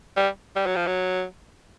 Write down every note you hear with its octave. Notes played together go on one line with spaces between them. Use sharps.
G3
G3
F#3
F3
F#3